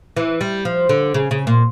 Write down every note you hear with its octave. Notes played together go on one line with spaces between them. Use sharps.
E3
G3
F3
D3
C#3
C#3
A#2